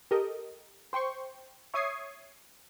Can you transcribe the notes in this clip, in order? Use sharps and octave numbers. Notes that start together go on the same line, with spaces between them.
G4 A4 A#4 D#5
C5 G5 C6 C#6
C#5 E5 C#6 D#6 G#6 C7